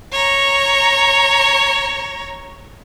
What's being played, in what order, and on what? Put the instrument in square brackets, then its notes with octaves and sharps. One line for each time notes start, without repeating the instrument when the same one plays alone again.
[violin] C#5 A#5